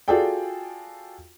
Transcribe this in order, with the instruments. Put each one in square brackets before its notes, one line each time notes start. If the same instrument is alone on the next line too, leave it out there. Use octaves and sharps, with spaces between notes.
[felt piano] F4 F#4 G#4 A4 D5 G5